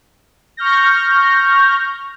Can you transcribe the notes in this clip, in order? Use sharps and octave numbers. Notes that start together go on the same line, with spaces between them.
C#6 F6 G6 A#6